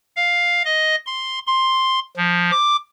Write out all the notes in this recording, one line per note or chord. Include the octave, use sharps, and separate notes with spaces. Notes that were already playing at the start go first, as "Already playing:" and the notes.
F5
D#5
C6
C6
F3
D6